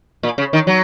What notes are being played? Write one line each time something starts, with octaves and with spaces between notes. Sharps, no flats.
A#2
C#3
D#3
F#3